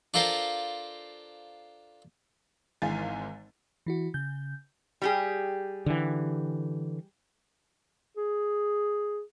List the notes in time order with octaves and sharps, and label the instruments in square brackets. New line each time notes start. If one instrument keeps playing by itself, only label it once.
[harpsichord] D4 F4 A4 A#4 C5 F5
[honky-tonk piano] G#1 G#2 E3 F5 G#5 A6
[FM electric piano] E3 E4 F#4
C#3 G6
[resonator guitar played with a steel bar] G3 G4 G#4
[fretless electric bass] D3 E3
[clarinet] G#4